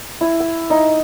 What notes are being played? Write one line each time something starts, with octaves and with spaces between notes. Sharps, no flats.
E4
E6
D#4